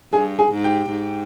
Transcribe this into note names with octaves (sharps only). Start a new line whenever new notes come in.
G2 G#4 G#5
G#4 G#5
G#2
G4 G5
G#2